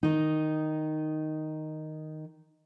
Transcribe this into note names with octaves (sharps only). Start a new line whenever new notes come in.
D#3 D#4